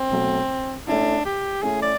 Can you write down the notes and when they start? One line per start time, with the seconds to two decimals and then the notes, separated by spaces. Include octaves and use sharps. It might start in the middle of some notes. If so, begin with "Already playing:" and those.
Already playing: C4
0.11 B2 F#3 A3
0.87 A3 C#4 D4 E4
1.25 G4
1.62 A3 C#4 E4 G#4
1.82 D5